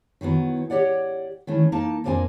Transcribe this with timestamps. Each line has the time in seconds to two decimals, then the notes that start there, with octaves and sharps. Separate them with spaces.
0.21 D#3 E3 F#3 B3
0.70 G4 C#5 D5 F#5
1.47 D#3 E3 A3 C#4
1.72 A#3 D#4 A5
2.04 F2 A#2 A#3 C4 D4 G#5